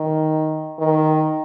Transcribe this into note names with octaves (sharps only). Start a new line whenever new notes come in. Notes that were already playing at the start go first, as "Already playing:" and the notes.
Already playing: D#3
D#3